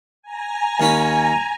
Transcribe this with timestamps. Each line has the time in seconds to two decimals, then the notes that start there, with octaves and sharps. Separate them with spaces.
0.22 G#5 A#5
0.80 D#2 C#4 B5